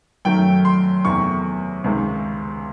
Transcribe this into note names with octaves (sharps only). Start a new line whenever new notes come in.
F#2 D#3 F#3 A3 G5
C6
E2 C3 D#3 F#3 A3 C#6
C#2 C3 D#3 G#3